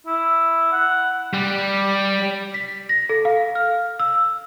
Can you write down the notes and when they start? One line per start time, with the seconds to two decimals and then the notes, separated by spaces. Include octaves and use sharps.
0.07 E4
0.72 F#5
1.34 G3
2.54 B6
2.89 A#6
3.09 A4
3.25 F5
3.55 F6
4.00 E6